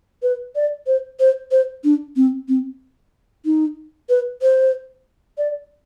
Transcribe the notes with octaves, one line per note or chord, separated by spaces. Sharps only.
B4
D5
C5
C5
C5
D4
C4
C4
D#4
B4
C5
D5